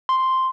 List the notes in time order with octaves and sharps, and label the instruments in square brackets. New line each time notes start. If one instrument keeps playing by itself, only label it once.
[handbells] C6